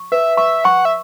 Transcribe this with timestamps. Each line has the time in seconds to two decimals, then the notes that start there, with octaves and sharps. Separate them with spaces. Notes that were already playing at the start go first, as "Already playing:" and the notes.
Already playing: C#6
0.12 B4 E5
0.37 E5 C#6
0.64 F#5 C#6
0.85 E5